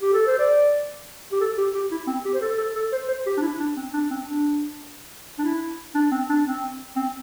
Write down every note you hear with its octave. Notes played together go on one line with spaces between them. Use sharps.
G4
A4
C5
D5
G4
A4
G4
G4
E4
C4
G4
C5
A4
A4
A4
C5
C5
G4
D4
E4
D4
C4
D4
C4
D4
D4
E4
D4
C4
D4
C4
C4